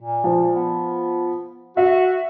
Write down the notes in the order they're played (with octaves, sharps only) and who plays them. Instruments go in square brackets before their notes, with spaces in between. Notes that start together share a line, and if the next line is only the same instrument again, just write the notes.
[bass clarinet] A#2
[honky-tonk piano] F3
[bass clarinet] B3
[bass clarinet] F#4 [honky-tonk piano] E5